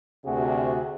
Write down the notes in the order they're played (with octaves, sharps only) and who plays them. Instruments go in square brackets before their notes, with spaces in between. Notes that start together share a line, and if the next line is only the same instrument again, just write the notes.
[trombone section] D2 C3 F#4 G#4